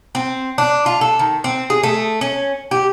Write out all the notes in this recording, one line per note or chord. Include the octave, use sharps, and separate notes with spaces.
C4
D4
F4
A4
D#3
C4
G#4
A3
C#4
G4